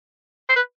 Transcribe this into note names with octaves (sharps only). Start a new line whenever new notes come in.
C5
B4